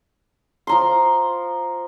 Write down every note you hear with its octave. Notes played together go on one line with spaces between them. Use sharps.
F3 A#5 C6